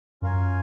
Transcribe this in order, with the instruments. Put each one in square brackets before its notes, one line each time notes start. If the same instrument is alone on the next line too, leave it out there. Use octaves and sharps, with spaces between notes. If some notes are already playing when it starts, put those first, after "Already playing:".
[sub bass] F#2 [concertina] C#4 F4 A#4 F5 G#5